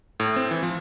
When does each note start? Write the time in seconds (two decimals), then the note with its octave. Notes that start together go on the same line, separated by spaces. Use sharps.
0.20 A2
0.36 C4
0.51 E3
0.63 F3